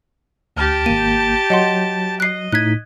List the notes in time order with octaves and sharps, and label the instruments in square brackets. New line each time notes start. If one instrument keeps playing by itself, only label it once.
[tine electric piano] D2 F6 [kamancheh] G4 A5
[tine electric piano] G#1 A#3 [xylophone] D#7
[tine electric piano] F#3 [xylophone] D#5 F#5 C6
[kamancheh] D#5 [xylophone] F#6 C7
[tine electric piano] A2 D#4 B6 [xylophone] F#6 G#6